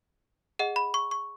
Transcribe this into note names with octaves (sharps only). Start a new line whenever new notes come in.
G#4 D#5 F#5
B5
C#6
C#6